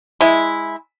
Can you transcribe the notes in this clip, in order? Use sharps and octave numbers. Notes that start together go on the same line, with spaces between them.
G#3 E4